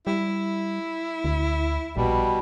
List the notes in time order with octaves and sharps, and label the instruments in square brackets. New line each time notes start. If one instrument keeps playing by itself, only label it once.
[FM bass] G3 [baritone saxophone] E4
[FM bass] D2
[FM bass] A#1 [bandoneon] B2 G3